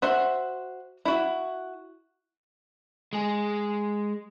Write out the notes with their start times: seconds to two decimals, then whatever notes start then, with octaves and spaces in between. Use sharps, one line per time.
0.02 F#4 C5 E5 F#5
1.05 E4 F#4
3.13 G#3 G#4